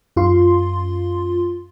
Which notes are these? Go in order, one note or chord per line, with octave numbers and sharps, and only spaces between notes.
F#2 F4 C6